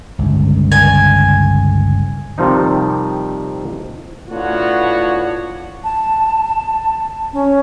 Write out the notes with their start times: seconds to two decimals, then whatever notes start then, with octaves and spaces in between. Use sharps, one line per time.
0.19 G1 C#2
0.72 G#5
2.38 C3 D#3 F3 G3 C4 D#4
4.30 A2 B3 D4 F4 F#4 C#5
5.84 A5
7.33 C#4